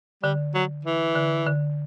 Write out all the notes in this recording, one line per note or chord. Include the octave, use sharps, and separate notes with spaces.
D3 G3
F#3
E3
D3
D3